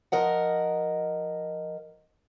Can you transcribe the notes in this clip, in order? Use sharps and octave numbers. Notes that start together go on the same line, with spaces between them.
F3 A#4 D#5 F#5